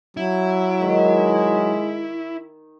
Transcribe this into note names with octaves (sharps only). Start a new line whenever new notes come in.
F#3 E4
D#3 G#3